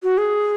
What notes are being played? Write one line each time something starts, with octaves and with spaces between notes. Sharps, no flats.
F#4
G#4